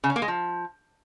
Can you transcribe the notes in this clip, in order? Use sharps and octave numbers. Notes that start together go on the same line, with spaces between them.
C#3
C#4
A#3
G#3
F3